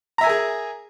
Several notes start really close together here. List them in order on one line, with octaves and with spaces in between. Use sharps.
A#5 E5 G#5 A#4 G#4